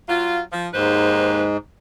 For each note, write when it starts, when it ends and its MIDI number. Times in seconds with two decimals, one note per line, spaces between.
0.09 0.40 54
0.09 0.40 65
0.52 0.68 53
0.73 1.45 39
0.73 1.57 44
0.73 1.45 71
0.73 1.45 72